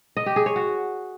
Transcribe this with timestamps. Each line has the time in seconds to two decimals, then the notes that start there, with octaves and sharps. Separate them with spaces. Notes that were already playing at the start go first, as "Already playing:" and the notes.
0.17 D#5
0.26 G4
0.36 G#4
0.46 C#5
0.56 F#4